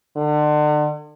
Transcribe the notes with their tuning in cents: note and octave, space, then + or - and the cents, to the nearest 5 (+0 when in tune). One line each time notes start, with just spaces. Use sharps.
D3 +35